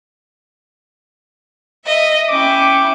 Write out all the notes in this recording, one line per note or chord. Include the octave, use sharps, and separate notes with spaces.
D#5 E5
C#4 E4 G5 D6